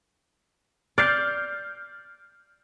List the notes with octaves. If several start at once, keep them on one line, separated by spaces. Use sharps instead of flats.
D5 F6 G6 C7